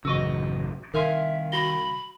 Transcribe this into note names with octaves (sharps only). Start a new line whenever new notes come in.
A1 F#2 C#3 F#4 B4 D#5 C#6 E6
C2 D#3 A#4 E5 F5 G#5 C6
F#4 B5 A#6 G7